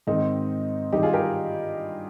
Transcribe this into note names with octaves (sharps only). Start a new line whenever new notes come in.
G#2 D#3 C4 D#4
G2 D#3 D#4 G4
F4 G#4
G4 A#4